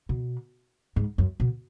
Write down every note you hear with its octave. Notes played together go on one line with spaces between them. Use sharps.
B2
G#2
F#2
B2